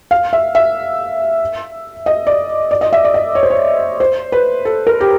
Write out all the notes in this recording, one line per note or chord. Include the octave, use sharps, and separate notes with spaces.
F5
E5
E5
D#5
D5
D5
D#5
E5
D5
D#5
C#5
C5
C#5
C5
B4
A4
A#4
G4